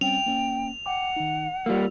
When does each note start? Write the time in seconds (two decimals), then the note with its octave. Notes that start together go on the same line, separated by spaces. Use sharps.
0.01 G3 C4 C#4 G5 F7
0.26 A#3 C#4
0.86 F#5 G5 D6
1.16 D#3 D#4
1.66 G3 A#3 F4 E6